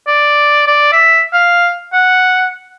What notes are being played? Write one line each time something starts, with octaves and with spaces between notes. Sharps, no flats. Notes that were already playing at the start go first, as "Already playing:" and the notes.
D5
D5
E5
F5
F#5